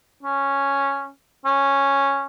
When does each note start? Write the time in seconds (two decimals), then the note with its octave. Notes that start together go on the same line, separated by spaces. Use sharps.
0.23 C#4
1.45 C#4